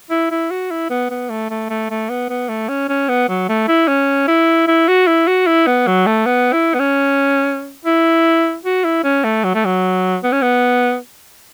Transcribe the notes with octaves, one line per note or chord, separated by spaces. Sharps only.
E4
E4
F#4
E4
B3
B3
A3
A3
A3
A3
B3
B3
A3
C#4
C#4
B3
F#3
A3
E4
C#4
E4
E4
F#4
E4
F#4
E4
B3
F#3
A3
B3
E4
B3
C#4
E4
F#4
E4
C#4
A3
F#3
A3
F#3
B3
C#4
B3